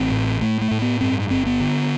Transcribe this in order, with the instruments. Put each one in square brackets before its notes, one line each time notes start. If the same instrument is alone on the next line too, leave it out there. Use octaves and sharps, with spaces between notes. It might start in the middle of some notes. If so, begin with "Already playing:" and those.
Already playing: [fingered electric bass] A1 C4
A2
A2 A3
A3
A2
B3
G2 C4
G1 C4
B3
D3